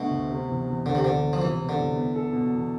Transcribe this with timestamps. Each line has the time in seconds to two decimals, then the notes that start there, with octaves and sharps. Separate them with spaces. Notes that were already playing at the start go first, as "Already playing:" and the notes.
Already playing: B2 D3 A3
0.11 D2
0.30 C3
0.49 E2
0.67 E2
0.85 D2 D3
0.95 C3
1.03 E1 D3
1.22 E1
1.33 F3
1.41 C3 E3
1.59 B3
1.69 D3
1.78 E2
1.96 B3
2.15 A4
2.33 B2
2.53 E2